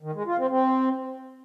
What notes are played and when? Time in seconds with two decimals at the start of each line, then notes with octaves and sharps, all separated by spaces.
0.03 D#3
0.15 G#3
0.26 F4
0.38 C4
0.50 C4